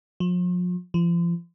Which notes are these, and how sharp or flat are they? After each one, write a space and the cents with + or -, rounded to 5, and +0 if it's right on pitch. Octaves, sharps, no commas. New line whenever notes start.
F3 +40
F3 -35